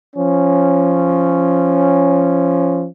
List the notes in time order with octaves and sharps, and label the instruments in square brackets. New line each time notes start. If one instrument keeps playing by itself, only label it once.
[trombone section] F3 C#4